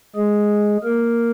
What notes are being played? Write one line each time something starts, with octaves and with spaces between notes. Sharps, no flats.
G#3 G#4
A#3 A#4